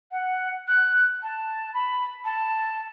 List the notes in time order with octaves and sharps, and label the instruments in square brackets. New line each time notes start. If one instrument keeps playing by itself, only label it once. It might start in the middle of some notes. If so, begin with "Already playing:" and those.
[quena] F#5
F#6
A5
B5
A5